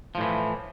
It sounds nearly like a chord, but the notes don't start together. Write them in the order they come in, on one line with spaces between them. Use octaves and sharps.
F3 A2 E3